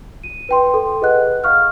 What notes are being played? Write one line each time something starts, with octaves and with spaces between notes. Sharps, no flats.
D#7
B4 G5 C6
A4
G#4 B4 D#5 F#5 F#6
F5 C#6 F6